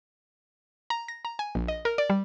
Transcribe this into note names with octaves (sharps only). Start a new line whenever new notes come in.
A#5
A#6
A#5
G#5
A#1
D#5
A#4
D5
G3